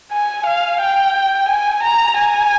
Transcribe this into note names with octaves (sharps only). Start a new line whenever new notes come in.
G#5
F5
G5
G#5
A#5
G#5